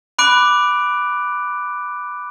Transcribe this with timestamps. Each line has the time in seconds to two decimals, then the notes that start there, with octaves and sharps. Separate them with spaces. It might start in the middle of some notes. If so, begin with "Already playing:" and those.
0.19 B5 D6 F#6 D7